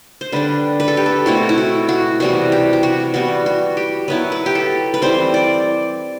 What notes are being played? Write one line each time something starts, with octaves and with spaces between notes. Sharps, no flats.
C5
D3 G3 D4 B4
B4
A4
G4
A4
B2 A3 C4 E4 F#4
E4
F#4
F#4
C3 E3 G3 B3 F#4
G4
G4
F#4
E3 G3 B3 F#4
F#4
G4
F#3 B3 E4 B4
B4
G4
A4
B4
E3 G3 C4 C5
D5